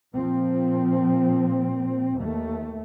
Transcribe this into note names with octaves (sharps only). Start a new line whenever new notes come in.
A#2 F3 C4
D#2 A3